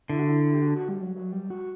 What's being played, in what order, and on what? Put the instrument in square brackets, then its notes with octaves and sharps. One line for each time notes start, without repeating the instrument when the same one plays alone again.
[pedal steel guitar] D3 [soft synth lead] E4
[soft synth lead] F#4
E4
G4
F#4
F#4
G3
F#3
F#3
G3
F#4